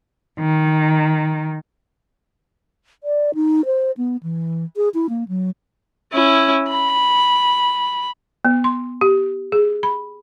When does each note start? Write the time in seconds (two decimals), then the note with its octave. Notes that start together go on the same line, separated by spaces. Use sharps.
0.38 D#3
3.04 D5
3.35 D#4
3.65 C5
3.97 B3
4.23 E3
4.76 G#4
4.94 E4
5.09 A#3
5.28 F#3
6.13 C#4 E4
6.70 B5
8.45 B3
8.64 C6
9.01 G4
9.52 G#4
9.83 B5